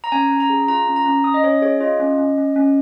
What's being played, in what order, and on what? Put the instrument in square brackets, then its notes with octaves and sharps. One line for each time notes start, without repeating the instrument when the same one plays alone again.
[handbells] A#5
C#4 G#5
C#4
A#5
G#4
F4 A#5
C#4
A#5
C#4
C#4 D#6
D#5
C#4 C#5
G#4 C#5
F4 D#5
C#4
C#4
C#4
C#4